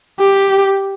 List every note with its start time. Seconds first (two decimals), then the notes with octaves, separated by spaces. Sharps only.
0.20 G4